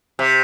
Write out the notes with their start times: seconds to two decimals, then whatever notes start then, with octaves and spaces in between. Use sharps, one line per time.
0.19 C3